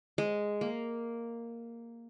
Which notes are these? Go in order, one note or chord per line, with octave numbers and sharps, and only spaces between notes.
G#3
A#3